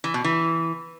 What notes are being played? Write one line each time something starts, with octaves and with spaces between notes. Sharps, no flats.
E3
B2
E3